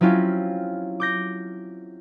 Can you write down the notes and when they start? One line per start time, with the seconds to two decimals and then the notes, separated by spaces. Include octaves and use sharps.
0.01 F#3 C4 C#4 E4 F4 G4
1.00 D6 G6 A#6